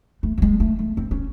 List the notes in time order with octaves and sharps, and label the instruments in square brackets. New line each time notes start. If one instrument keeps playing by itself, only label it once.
[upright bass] A3
F#3
G#3
A3
A3
C4
C#4